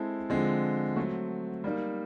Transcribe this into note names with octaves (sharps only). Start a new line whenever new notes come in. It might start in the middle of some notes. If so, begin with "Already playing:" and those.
Already playing: G#3 C4 E4 A4
D3 F3 G#3 C4
F#3 A3 C4
G3 A#3 D#4